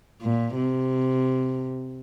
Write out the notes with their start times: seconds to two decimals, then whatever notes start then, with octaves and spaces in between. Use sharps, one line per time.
0.22 A#2
0.56 C3